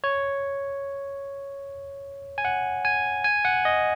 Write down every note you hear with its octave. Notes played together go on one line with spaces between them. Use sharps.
C#5
G#5
F#5
G#5
G#5
F#5
D#5